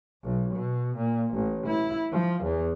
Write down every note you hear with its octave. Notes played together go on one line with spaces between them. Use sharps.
B1
B2
A#2
A1
E4
F3
E2